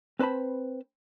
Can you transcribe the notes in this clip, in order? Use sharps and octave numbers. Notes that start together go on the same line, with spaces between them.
C4 B4 C5 A5 B5